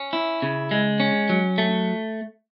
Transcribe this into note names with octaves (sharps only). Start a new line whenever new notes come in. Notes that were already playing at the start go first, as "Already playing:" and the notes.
Already playing: C#4
E4
C#3
G#3
C#4
F#3
A3